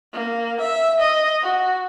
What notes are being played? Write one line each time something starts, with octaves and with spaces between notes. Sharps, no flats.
A#3
E5
D#5
F#4